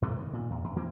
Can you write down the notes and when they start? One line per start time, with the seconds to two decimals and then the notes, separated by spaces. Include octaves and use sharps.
0.02 G2 C3 E3 A3
0.17 D#3
0.33 A#2
0.50 E2
0.64 E2
0.76 E3 A#3 C4